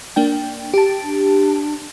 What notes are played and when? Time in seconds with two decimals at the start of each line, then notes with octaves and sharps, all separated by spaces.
0.16 A#3 D4 G5
0.74 G4 A5
1.03 D4